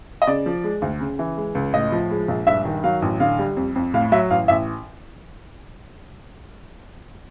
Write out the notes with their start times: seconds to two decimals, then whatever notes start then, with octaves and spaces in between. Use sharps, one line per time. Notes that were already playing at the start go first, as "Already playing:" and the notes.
0.22 D#5
0.27 C#3 D5
0.46 F3
0.64 G#3
0.82 D2
1.00 C#3
1.19 E3
1.37 G#3
1.55 C#2
1.74 A2 D#5
1.92 F3
2.11 G#3
2.28 A#1
2.47 G2 E5
2.65 D#3
2.84 F#3 F5
3.02 A1
3.20 D3 F5
3.39 G3
3.57 F2
3.76 F2
3.94 A2 F5
4.12 F#3 E5
4.30 A1 F5
4.48 A1 E5